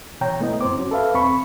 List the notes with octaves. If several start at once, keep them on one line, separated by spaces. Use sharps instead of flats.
B2 E3 C#5 G5 A#5
A3 B3 E4 D#5
F#2 C4 C5 D6
C#4 F#4
A4 B4 E5 F5
E2 C4 B5 C#6